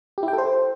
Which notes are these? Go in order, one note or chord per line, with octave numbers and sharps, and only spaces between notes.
G4
E4
G5
A4
C5